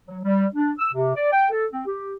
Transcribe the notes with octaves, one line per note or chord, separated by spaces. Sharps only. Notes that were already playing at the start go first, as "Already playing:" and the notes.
F#3
G3
D4
E6
C3
D5
G5
A4
C4
G4